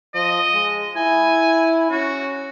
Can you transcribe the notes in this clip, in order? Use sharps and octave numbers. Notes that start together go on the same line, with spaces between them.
F3 D#5
G#3
E4 G#5
C#4 F#4